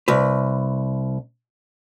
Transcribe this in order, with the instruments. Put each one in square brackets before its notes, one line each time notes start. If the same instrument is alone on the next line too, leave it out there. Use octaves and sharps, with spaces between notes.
[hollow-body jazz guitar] C2 B4